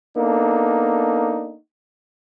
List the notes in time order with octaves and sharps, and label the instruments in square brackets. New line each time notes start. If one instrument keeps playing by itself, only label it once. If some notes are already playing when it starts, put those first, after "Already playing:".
[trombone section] A#3 B3 D4 D#4 A4